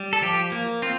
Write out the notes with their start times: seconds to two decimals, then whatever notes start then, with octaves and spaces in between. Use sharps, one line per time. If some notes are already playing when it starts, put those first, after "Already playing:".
Already playing: G3
0.13 A4
0.22 F3 G4
0.52 A#3
0.82 C4 F4